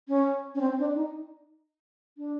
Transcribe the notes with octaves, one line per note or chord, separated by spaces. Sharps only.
C#4
C#4
C4
D4
D#4
D4